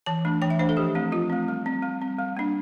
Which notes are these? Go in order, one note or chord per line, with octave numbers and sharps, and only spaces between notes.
E3 A5
A3 D4
E3 G5
E5
A3 D4 C5
A4
F3 G4
A3 C4
F3 F4
A3 C4
G3
C4
G3
C4
G3
A#3 D4